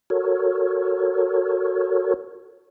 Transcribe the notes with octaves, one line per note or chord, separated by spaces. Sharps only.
F#4 A4 A#4 C#5